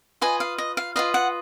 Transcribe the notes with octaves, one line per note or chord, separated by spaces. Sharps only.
F4 B4 D#5 G#5
F5
D#5
F5
F4 B4 D#5 F5
F#5